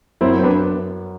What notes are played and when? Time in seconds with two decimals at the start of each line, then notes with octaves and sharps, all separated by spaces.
0.21 F#2 C4 E4
0.39 C4
0.43 B3 D4